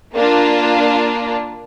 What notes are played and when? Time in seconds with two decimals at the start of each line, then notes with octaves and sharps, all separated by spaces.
0.15 A#3 D4 F4